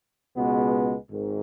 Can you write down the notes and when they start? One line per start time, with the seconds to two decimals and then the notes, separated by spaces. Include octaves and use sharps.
0.37 C#2 B2 G#3 B3
1.10 G#1 G#2 D#3